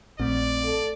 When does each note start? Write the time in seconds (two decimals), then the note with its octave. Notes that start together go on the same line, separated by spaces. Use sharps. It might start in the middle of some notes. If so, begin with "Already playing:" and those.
0.20 A#1 A3 C4 D5
0.63 A4